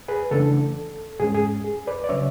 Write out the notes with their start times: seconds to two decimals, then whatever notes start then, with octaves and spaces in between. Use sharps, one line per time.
0.08 G#4 B4
0.31 C#3 E3 A3 D4 A4
1.20 G#2 G#3 C#4 G#4
1.35 G#4
1.64 G#4
1.87 B4 D5
2.04 D5
2.09 C#3 F#3 C#4 C#5 E5